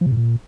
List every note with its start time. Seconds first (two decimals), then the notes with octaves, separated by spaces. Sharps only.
0.01 F3
0.06 C3
0.12 A2
0.17 A#2